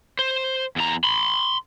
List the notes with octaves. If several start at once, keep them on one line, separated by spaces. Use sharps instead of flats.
C5
E2 A#5
B5 C6